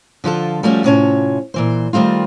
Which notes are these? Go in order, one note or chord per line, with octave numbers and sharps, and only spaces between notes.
D3 F3 F4 A4
F3 G3 A3 C#4 F4 F#4
A2 C3 C#4 F4 C#5 A5
A#2 E3 C5
D#3 G3 A3 C4 F4